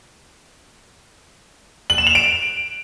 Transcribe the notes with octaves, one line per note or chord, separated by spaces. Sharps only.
F#7
E7
F7
D7